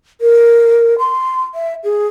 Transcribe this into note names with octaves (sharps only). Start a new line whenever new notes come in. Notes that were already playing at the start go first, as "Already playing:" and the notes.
A#4
C6
E5
G#4